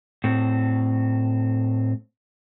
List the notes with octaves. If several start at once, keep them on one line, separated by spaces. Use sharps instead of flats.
A2 C4